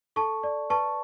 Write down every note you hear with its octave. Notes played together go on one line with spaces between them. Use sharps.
A4 A5 C#6
D5
B4 A5 C#6